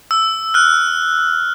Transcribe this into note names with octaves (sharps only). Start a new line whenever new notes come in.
E6
F6 F#6